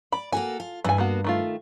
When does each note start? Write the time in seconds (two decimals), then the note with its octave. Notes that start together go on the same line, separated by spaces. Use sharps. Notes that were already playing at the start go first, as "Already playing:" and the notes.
0.12 D5 B5
0.32 A#3 F#4 A4 G#5
0.60 F4
0.84 G2 E3 G#5
0.98 A#3 B3 F#4
1.24 D#3 A3 F4